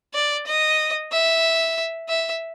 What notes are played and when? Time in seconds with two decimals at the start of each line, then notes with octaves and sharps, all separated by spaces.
0.14 D5
0.47 D#5
1.12 E5
2.09 E5